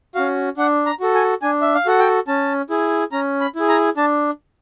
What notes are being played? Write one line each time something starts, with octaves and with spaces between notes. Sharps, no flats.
C#4 F#4 F5
D4 F#5
A#5
F#4 A4
G#5
D4 G#5
E5
F5
F#4 A4 F#5
G5
C#4 A5
E4 G#4
C#4 A#5
B5
E4 G#4
A#5
D4 A5